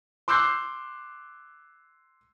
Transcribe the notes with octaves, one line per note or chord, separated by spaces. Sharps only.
C6 D6 E6 F#6 G6 C7